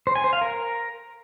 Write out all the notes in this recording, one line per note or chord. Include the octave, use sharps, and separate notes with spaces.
C5
G#5
C5
F5
A#4